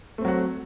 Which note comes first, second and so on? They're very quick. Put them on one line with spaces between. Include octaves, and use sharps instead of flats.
A3 C4 F#3 F#4